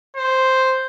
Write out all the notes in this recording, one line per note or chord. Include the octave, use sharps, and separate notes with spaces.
C5